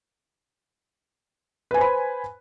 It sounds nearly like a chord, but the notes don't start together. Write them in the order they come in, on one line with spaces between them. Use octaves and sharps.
B4 G#5 C5 B5